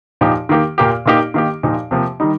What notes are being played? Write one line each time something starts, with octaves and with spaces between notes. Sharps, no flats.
A#2 F3 D#4 G4
D#3 A#3 G4
A#2 A#3 G4
A#2 A#3 D#4 G4
D#3 A#3 D#4 G4
A#2 F3 D#4 G4
C3 F3 A#3 G4
D#3 G3 D#4